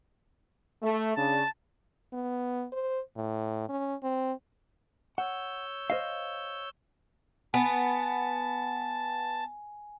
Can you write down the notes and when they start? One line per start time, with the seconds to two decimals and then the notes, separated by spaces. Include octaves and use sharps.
0.83 A3
1.17 C#3 D4 A5
2.13 B3
2.72 C5
3.16 A2
3.69 C#4
4.03 C4
5.18 C#5 F#5 E6 G6
5.90 C5 D#5 F5
7.54 B3 G#5 A5